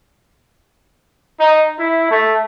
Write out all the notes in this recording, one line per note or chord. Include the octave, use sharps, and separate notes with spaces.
D#4
E4
A3